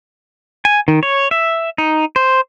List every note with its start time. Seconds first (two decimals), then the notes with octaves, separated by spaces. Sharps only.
0.65 G#5
0.88 D#3
1.03 C#5
1.31 E5
1.78 D#4
2.16 C5